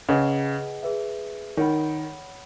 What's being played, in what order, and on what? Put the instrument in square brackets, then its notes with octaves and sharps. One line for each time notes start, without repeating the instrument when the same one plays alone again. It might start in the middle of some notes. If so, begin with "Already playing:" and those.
[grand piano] C#3 [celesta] G#4 B4 D#5 F#5
[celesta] G#4 B4 E5
[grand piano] D#3 [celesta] C#5 F#5 B5